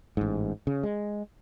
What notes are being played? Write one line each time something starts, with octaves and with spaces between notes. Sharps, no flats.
A1 G#2
C#3
G#3